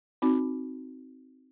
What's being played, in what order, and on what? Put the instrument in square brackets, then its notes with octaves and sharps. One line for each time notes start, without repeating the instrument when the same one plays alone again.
[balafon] C4 D#4 F#4